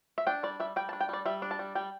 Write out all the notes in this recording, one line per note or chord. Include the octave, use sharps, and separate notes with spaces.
E5
D4 G5
G3 D5
G3 E5
G3 G5
A5
D4
G5
G3 D5
G3 E5
D4
A5
G3
G3 G5